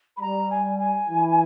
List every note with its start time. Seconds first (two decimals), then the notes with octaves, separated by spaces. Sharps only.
0.16 B5
0.20 G3 A#5
0.50 G#5
0.79 G#5
1.09 E3